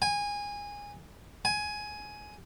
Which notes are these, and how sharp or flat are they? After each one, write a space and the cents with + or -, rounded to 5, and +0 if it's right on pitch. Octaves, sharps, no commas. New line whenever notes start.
G#5 -20
G#5 +10